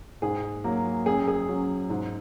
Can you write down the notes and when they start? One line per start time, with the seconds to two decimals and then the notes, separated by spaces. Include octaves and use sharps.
0.22 G#2 G#4
0.64 F#3 A#3
1.06 F#2 G#4
1.28 G#4
1.48 F#3 C#4
1.90 G#2